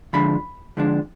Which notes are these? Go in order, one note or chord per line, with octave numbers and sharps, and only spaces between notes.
D3 F3 G#3 D4 B5
D3 F3 G#3 D4